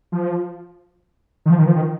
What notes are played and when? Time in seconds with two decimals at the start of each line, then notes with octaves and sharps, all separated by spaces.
0.12 F3
1.46 D#3
1.50 F3
1.59 D#3
1.67 F3
1.76 D#3